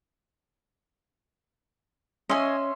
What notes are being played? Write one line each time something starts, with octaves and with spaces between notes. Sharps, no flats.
C#4 C#5 D#5 E5 G#5 C6